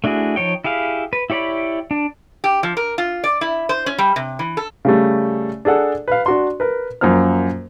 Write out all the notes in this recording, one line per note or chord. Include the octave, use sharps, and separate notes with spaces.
A3 D4 E4 F#4 G#4
F3 D#4 C#5 G5
E4 G4 G#4 F5
B4
E4 G4 C#5 D5 B5
D4
G4
F3
A#4
F4
D5
E4
C5
C#4
G3
C3
E3
A4
C#3 G3 A3
D4 G#4 A4 F#5
B4 F5
D4 F#4 C6
A#4 B4
F#2 F3 A#3 C5 F6